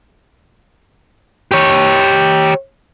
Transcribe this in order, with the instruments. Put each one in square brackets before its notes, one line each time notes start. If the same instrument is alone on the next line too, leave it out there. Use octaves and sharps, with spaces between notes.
[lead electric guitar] G4 C#5